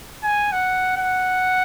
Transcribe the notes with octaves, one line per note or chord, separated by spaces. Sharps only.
G#5
F#5
F#5